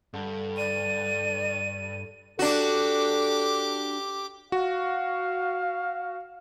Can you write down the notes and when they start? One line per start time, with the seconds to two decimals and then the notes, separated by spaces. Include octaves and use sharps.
0.14 G2 D3
0.57 D5 D#7
2.39 D4 F#4 G4 A4 D6
4.52 F#4 F5